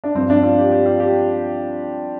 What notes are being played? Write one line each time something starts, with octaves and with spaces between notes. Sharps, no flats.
D4
G2 F3 C4
D4
F4
G4
G4
F4
G4